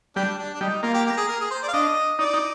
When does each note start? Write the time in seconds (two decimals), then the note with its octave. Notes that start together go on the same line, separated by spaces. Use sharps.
0.16 G3 D4
0.38 D4
0.54 D4
0.61 G3 D#4
0.83 A#3 F4
0.94 G4
1.06 G4
1.17 G#4
1.28 A#4
1.40 G#4
1.51 C5
1.63 D5
1.68 F5
1.74 D4 D#5
2.19 D#4 D5
2.34 D#4